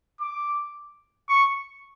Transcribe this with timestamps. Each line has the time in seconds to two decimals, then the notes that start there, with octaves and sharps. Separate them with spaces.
0.21 D6
1.29 C#6